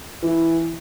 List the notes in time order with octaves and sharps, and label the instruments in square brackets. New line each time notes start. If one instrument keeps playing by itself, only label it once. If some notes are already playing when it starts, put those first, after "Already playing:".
[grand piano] E3